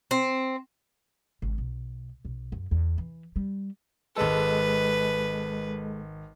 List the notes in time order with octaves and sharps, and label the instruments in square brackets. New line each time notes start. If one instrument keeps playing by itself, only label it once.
[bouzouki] C4
[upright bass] G#1
B1
B1
F#2
E2
E3
G3
[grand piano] G#1 A5 [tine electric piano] G#3 A4 [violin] B4